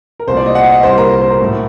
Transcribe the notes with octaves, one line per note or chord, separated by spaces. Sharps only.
A#4
C2 A#2 A3 C5
D5
D#5
F#5
D#5
C2 A#2 G3 C5
A#4
A#4
C5
A#4
A2 F#3 A3